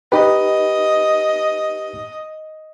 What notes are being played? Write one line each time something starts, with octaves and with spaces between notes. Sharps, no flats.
D#4 G4 B4 D#5